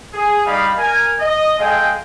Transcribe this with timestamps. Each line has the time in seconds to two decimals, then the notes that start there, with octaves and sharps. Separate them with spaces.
0.13 G#4
0.46 G3 D#4 D#5 F5 B5
0.78 A#4 G#5
1.20 D#5
1.59 G#3 A4 F5 G5 G#5